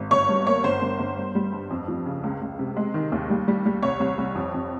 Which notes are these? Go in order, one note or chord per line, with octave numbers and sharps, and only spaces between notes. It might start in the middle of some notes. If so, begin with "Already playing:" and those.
Already playing: G#1
G1 C#5 C#6
G2
A#3 C#5
G1 C5
G1
G1
G2
G3
G2
F2
F3
C#3
C#2
C#2
C3
G#3
D#3
D#2
G3
G3
G3
C2 C#5
C2
C2
F2
F2